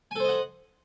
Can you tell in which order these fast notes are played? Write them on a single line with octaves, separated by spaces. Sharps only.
G#5 A4 C5 D#5 F#5